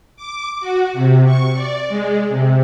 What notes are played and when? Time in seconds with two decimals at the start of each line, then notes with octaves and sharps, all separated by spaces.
0.16 D6
0.60 F#4
0.93 C3
1.25 C#6
1.54 D5
1.89 G#3
2.30 C3